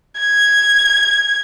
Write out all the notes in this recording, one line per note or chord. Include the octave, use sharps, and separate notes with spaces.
G#6